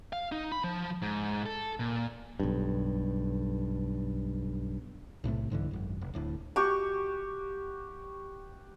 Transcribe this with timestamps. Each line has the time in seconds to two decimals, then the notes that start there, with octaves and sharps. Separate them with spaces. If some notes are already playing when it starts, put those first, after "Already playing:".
0.13 F5
0.32 D#4
0.52 B5
0.64 F3
1.02 G#2
1.46 A4
1.80 A#2
2.40 B1 G2
5.24 B1 A2 C3 A3
5.50 C2 G#2 D3 E3
5.71 G#1 F#2
6.01 F1
6.14 D1 D2 A2
6.56 F#4 G4 C#6